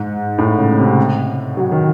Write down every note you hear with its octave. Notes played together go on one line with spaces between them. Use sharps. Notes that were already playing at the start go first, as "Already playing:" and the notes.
Already playing: G#2
A2
C#3
C3
F#3
D#3